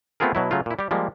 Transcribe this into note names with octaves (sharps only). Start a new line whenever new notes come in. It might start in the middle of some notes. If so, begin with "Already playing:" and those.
A3 B3 C4 F4 G#4 A#4
B2 F#3 E4
C#3 F#3 A3 F4
A#2 E4
G3 G4
F3 G3 G#3 A#3